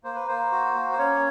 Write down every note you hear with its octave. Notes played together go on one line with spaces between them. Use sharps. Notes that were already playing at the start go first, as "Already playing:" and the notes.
A#3 C5
B4
A#3 C5
F#4
A#3
C5
C#4 C#5